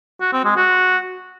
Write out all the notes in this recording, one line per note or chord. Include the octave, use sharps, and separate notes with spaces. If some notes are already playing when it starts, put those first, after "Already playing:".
F#4
C4
G#3
F#4